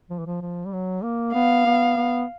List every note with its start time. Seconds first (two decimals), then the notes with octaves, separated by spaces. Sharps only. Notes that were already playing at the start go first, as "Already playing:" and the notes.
0.10 F3
0.19 E3
0.26 F3
0.41 F3
0.65 G3
0.72 F#3
1.03 A#3
1.34 B3 F5
1.66 B3
1.97 B3